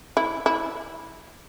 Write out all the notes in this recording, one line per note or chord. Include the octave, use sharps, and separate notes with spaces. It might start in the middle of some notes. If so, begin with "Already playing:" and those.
E4
E4